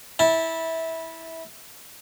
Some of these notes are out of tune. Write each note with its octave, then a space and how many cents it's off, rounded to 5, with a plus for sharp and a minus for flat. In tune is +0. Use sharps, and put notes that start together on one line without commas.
E4 -20 A5 +0